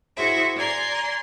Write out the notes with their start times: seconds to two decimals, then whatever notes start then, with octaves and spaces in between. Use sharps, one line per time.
0.16 E4 F#4 G#4 C5 E5
0.55 D5 G#5 A#5 C6